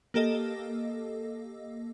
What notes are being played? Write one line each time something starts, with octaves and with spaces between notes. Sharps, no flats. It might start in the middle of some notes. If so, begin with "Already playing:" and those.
A#3 G4 A4 D#5